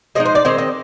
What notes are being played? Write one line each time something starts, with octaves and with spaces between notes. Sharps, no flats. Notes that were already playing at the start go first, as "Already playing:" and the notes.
F3 G#3 D#4 D#5
C5
D5
D#3 G#3 C4 C5
D#5